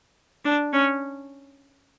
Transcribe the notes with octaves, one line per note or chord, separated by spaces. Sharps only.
D4
C#4